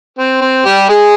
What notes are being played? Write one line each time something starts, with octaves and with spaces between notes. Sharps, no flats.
C4
C4
G3 G4
G#3 G#4